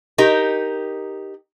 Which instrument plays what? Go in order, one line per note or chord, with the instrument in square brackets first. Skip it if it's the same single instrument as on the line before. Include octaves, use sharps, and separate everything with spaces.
[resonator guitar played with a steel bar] D#4 G4 A#4